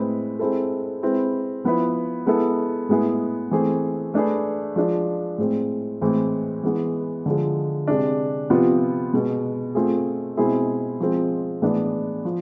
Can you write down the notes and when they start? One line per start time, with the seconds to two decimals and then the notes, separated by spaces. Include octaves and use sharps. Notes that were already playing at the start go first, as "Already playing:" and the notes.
Already playing: A2 G#3 C4 G#4 B4
0.39 G#3 C4 E4 A4
1.02 G#3 C4 E4 B4
1.64 F3 B3 E4 B4
2.26 G#3 B3 E4 A4
2.89 A2 G#3 B3 E4 G#4
3.51 E3 A3 C4 G#4
4.14 A3 D4 G#4 B4
4.76 F3 G#3 D4
5.38 A2 G#3 C4
6.02 A2 E3 G#3 C4
6.63 E3 G#3 B3
7.26 D3 F3 G#3
7.88 C3 G#3 D4
8.50 C3 F3 B3 F4
9.13 B2 G#3 B3
9.75 A3 C4 F4 G#4
10.37 B2 G#3 C4 E4 G#4
11.00 F3 G#3 C4
11.62 A2 E3 G#3 B3 D4
12.25 F3